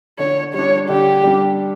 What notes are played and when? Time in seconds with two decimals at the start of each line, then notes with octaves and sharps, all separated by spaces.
0.19 D3 C#5
0.54 G3 D4 C#5
0.89 D3 G4
1.24 G3 D4